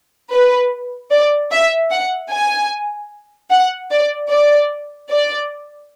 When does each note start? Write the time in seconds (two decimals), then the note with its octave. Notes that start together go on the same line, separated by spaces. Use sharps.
0.31 B4
1.11 D5
1.51 E5
1.91 F#5
2.30 G#5
3.50 F#5
3.91 D5
4.31 D5
5.10 D5